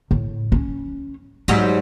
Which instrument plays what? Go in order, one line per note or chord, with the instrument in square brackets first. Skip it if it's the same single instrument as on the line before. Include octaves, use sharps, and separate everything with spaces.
[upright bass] A2
C#4
[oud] G#2 F#3 G3 [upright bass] D4